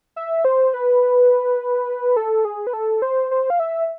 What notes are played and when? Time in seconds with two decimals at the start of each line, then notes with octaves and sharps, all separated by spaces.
0.16 E5
0.45 C5
0.74 B4
2.16 A4
2.45 G#4
2.67 B4
2.73 A4
3.02 C5
3.31 C5
3.50 F5
3.60 E5